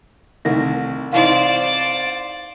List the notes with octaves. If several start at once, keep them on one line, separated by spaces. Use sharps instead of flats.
C2 D#3 A3 A#6
C2 E3 D#4 C5 D5 F5